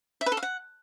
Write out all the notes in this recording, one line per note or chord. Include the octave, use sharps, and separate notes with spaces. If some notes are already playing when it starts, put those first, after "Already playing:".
E5
B4
A4
F5
F#5